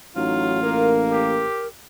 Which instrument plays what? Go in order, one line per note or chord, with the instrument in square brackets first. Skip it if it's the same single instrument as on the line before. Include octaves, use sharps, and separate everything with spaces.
[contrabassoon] A1 [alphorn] F#3 [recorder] D#4 [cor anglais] F4
[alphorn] A#3 [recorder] A#4
[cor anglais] G4